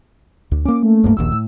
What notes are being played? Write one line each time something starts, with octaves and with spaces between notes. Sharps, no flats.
D2
A#3 C#4 D6
A3
D1 G2 A#3
D#1 A#1 D#2 E6
A2